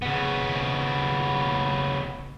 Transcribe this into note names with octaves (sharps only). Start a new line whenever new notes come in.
C#3 B3